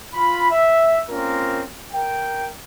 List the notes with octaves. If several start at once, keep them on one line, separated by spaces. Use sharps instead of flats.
F4 B5
E5
A#3 C4 C#4 F4 A#4
A#4 G5